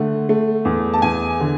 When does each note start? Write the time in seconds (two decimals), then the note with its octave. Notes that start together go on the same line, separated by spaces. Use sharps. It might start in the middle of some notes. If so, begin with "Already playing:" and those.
Already playing: D3 A3 F#5
0.29 A3
0.65 E2
0.94 A5
1.02 E2 G#5
1.40 D3